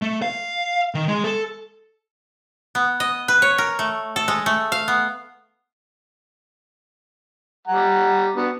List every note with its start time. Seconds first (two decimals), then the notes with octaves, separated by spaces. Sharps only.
0.02 A3
0.22 F5
0.95 D#3
1.08 G#3
1.24 A4
2.75 B3
3.00 D#5
3.28 B4
3.42 C#5
3.58 A#4
3.79 A3
4.16 A4
4.28 G#3
4.46 A3
4.72 F5
4.88 B3
7.68 G3 F#5 A#5
8.36 B3 D4 F#4